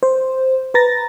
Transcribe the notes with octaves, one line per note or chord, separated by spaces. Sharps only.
C5
B4 A#5 A6 A#6